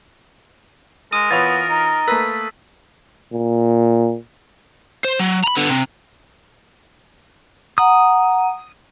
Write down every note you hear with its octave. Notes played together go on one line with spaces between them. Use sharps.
G#3 A#4 D#6 D#7
E3 B3 F4 C#5 A6
D#4
A3 A#3 B4 E6 B6
A#2
C5
F#3
A#5 B5
D3 B3
C3
F#5 A#5 D#6